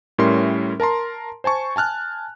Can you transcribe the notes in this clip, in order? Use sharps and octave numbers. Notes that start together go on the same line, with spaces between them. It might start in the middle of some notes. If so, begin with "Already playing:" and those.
A2 G3 C#4 A#4 E5 C6
A#4 A5 A#5 C6
C5 G#5 A5 C#6
G#5 A5 F6 F#6